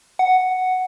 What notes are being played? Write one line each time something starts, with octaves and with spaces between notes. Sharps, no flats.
F#5